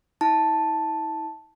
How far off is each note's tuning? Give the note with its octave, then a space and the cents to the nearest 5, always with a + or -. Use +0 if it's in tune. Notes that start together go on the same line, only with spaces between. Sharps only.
E4 -40 A5 +0